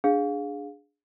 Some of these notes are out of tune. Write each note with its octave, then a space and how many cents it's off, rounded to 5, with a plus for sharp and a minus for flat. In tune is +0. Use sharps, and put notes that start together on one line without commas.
D4 +0 G#4 -5 F5 +25